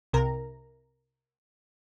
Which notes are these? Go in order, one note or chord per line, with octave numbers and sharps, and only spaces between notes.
C2 C3 A#4 A#5